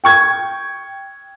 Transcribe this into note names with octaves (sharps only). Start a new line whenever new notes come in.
G5 C#6 G#6